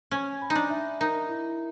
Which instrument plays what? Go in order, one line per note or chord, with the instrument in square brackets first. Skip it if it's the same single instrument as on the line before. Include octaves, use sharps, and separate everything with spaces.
[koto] C#4 [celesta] G#5
[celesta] B5
[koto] D#4
D4
[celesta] E5
[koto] D#4 [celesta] A#4
[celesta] E4